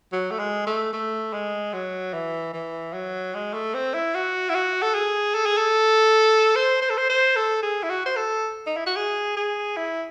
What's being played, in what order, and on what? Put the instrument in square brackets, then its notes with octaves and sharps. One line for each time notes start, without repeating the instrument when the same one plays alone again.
[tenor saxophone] F#3
A3
G#3
A3
A3
G#3
F#3
E3
E3
F#3
G#3
A3
C4
E4
F#4
E4
F#4
A4
G#4
A4
G#4
A4
C5
C5
A4
C5
C5
A4
G#4
E4
F#4
C5
A4
D#4
E4
F#4
G#4
G#4
E4